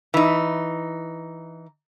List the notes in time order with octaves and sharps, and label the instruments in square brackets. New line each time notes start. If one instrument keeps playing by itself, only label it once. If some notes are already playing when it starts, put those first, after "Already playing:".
[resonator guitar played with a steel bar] E3 D#4